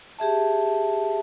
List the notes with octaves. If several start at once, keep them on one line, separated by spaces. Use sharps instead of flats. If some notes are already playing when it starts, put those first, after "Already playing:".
G4 G#4 E5 A5